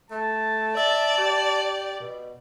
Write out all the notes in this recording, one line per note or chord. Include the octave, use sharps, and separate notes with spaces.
A3 A5
D5 E5
G4
B2